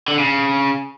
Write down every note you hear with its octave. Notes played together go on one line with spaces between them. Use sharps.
D3
C#3